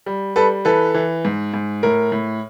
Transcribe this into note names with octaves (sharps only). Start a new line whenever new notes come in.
G3
G3 A4 B4
E3 A4 B4
E3
G#2
G#2
A2 A#4
A2